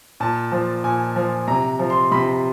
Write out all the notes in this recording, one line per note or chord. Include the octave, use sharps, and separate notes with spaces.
A#2 A5
F3
A#2 G#5
F3
C3 A#5
F3
C6
C3 B5